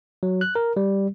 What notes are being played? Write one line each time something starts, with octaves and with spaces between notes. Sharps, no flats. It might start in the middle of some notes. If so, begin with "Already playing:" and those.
F#3
F#6
A#4
G3